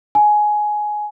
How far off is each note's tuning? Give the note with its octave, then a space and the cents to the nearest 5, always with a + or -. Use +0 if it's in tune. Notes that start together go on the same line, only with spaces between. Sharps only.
G#5 +15